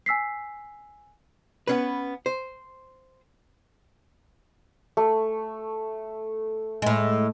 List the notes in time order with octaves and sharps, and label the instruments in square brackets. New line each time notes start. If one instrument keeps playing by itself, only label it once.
[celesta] G#5 E6 B6 C7
[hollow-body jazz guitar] B3 C#4 B4
C5
[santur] A3
[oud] A2 G#3